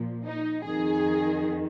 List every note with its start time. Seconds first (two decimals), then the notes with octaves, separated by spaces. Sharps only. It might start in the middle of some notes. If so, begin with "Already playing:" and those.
Already playing: A#2 F3
0.25 D#4
0.64 F2 D#3 G#4